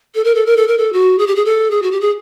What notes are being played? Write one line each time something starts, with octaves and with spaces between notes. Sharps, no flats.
A4
A#4
A4
A#4
A4
A#4
A4
F#4
G#4
G4
G#4
A4
G#4
F#4
G4
G#4